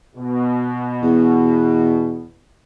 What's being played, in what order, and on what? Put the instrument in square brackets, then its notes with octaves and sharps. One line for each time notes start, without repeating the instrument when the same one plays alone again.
[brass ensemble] B2
[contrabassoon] E2